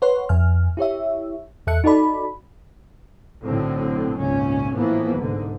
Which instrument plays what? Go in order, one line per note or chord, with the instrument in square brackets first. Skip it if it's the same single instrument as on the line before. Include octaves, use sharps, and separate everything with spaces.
[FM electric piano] B4 C#5 F#5 C6
F2 G#5 F6
E4 G4 C#5 E5
E2 A4 E5 F#6 C#7
D#4 F#4 A4 D5 B5
[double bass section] B1 A2 D3 F#3 C4
G#1 C#2 A#2 C#4
A2 E3 F3 A#3 B3
C2 G#2 D3